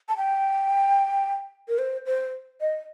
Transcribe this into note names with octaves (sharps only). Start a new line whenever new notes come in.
A5
G5
A#4
C5
C5
D#5